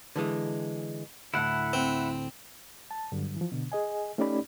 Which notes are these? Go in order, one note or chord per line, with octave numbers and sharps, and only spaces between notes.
D3 E3 G#3
D2 A2 E4 F#5
C4
A5
G2 D3 F#3 G3
E3 F3
B2 D3
G#4 D#5 G#5
A3 C#4 D#4 G4 D5 B5